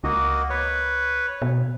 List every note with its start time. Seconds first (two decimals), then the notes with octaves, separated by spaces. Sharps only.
0.04 C#2 A#3 F#4 D#5
0.50 B4 C#5
1.42 B2